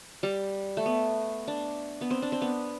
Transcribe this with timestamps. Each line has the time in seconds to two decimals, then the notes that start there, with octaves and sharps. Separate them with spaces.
0.23 G3
0.77 A3
0.86 B3
1.48 D4
2.01 B3
2.11 C4
2.22 D4
2.32 C4
2.42 B3